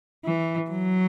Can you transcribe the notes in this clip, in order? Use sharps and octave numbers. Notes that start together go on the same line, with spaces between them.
E3
F#3